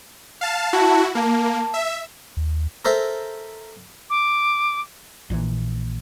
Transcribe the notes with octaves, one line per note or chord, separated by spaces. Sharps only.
F5 A5
E4 F#4 A5
A#3 A5
E5
D#2
A4 A#4 C5 E5
D6
A#1 A#2 D3 E3